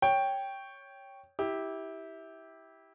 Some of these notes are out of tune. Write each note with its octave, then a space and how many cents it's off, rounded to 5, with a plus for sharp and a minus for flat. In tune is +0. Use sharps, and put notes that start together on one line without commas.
C#5 +0 G5 +0
E4 -20 G4 +0